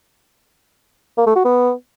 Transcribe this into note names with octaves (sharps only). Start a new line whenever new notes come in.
A#3
A3
F#4
B3